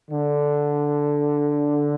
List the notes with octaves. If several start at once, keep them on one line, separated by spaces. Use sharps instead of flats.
D3